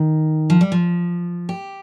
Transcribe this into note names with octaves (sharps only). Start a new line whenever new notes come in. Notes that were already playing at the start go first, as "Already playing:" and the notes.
Already playing: D#3
F3
G3
F3
G4